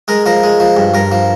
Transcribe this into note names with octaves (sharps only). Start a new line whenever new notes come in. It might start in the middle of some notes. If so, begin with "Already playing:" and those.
G#3 A#4
F3 A#4
G#3
F3
G2
G2 A#4
F3